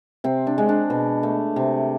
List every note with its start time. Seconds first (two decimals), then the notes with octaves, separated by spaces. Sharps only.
0.24 C3 C4
0.47 D4
0.58 G#3
0.69 D4
0.90 B2
1.23 A3
1.56 C3